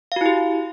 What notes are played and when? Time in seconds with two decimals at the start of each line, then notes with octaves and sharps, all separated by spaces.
0.12 F5
0.16 F#4
0.21 E4
0.26 G4